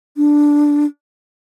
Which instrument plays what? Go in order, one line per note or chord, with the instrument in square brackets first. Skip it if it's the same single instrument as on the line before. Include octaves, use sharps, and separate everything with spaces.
[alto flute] D4